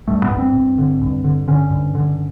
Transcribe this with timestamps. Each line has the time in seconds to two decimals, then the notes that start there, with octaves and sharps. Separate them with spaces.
0.08 G2 A3
0.24 B3
0.31 G2
0.39 C4
0.54 G2
0.78 D3
1.01 G2
1.24 D3
1.48 D3 C#4
1.71 G2
1.95 D3